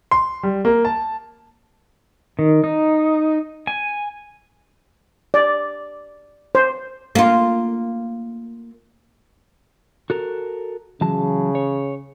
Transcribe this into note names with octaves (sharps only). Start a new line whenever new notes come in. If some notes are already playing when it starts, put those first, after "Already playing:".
C6
G3
A#3
A5
D#3
D#4
G#5
D5
C5
A#3 F4
F#4 A4 A#4
C#3 E3 F#3 A5
C#5